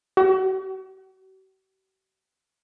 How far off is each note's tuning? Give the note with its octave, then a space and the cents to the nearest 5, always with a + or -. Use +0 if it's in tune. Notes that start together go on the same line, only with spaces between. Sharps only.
F#4 +45